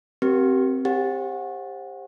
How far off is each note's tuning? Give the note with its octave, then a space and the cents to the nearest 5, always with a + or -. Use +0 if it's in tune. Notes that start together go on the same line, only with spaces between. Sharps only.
C4 +0 G4 -30 A#4 +25
G4 +20 C5 +30 F#5 -30